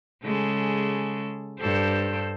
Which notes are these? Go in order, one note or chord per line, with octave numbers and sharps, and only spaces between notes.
C#3 G#3 A4
G2 A4 C5